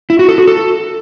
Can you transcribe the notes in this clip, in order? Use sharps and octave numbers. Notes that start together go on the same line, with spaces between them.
E4
F#4
A4
F#4
A4